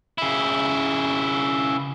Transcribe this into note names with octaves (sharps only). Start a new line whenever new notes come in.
C#3 E4